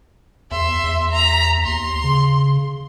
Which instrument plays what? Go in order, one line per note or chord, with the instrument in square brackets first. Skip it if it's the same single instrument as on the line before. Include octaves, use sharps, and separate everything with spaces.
[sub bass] E2 [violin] E5 C6
[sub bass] E2
[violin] A#5 B6
[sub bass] D#2 [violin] C6
[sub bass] C#3